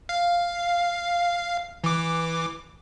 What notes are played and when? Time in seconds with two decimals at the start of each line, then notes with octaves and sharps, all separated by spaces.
0.09 F5
1.84 E3 D6